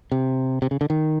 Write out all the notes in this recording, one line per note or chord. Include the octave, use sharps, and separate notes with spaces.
C3
C3
C#3
D3
D#3